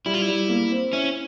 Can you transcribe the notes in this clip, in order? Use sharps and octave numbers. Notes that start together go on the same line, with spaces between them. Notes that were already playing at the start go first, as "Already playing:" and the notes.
G3 E4
F4
E4
G3
A#3
C4
C#4 E4